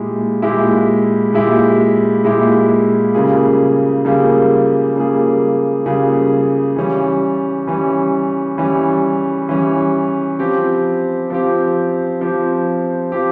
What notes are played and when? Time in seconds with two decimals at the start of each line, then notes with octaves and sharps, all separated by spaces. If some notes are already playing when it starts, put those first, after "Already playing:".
Already playing: A#2 G#3 E4 G4
0.42 A#2 G#3 E4 G4
1.33 A#2 G#3 E4 G4
2.24 A#2 G#3 E4 G4
3.14 C#3 G3 A#3 F4 G#4
4.05 C#3 G3 A#3 F4 G#4
4.96 C#3 G3 A#3 F4 G#4
5.86 C#3 G3 A#3 F4 G#4
6.76 E3 G3 C#4
7.67 E3 G3 C#4
8.58 E3 G3 C#4
9.49 E3 G3 C#4
10.39 F3 C4 G4
11.30 F3 C4 G4
12.21 F3 C4 G4
13.12 F3 C4 G4